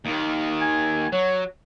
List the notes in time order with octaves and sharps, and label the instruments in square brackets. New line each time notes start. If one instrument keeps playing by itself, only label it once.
[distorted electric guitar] D#2 D#3
[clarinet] G#5
[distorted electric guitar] F#3 [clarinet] C#5